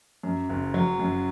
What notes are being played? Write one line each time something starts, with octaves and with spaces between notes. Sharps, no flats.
F#2
F#1
F#3
F#2